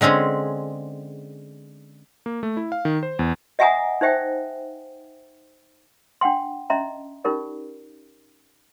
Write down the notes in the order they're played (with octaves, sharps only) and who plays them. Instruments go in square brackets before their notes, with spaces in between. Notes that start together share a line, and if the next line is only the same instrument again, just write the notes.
[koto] D3 G#3 C4 C#4 G#4
[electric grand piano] A#3
A3
E4
F5
D#3
C5
E2
[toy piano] D#5 E5 F#5 G#5 A#5 D#6
D#4 C5 E5 G5
D4 F#5 G5 C6
C#4 D#5 E5 A5 A#5 C6
C#4 D#4 F4 G4 A#4 D5